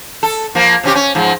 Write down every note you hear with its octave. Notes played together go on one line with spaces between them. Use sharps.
A4
F3 A#3
C3 C#4 G4
C#4
G#2 F3